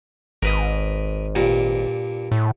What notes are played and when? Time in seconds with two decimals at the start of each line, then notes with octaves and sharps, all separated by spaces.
0.43 G#1 A#4 B4 D#5
1.35 G2 A#2 A#3
2.32 A2